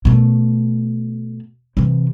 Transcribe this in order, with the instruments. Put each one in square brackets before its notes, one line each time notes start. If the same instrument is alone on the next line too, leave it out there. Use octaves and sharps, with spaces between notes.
[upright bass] B2 A3
C3 E3